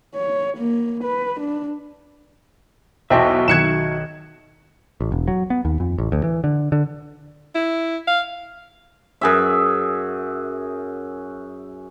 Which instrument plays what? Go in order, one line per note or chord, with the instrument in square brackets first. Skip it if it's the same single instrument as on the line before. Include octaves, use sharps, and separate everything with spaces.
[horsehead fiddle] C#5
A#3
B4
D4
[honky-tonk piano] B1 E2 [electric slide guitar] F#4 D#5 E5 [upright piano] C5 G5 A5
[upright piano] B1 D#3 F#6 [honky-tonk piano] G#6 C#7 E7
[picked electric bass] A1
E1
F#3
B3
D#2
F2
A1
D2
E3
D3
D3
[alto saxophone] E4
F5
[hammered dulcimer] F#2 G#4 E5